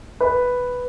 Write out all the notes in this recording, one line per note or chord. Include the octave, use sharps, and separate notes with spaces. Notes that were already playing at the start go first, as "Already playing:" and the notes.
B4